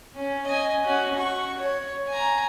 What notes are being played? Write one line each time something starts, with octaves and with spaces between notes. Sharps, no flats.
C#4
D#5 G#5
C#4 F#4
F#4 C#6
C#5
G#5 A#5